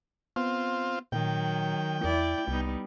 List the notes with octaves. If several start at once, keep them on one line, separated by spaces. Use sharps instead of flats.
B3 C4 F4
A#2 D#3 F#3 G5
E2 E4 D5
C2 G3 B3 D#4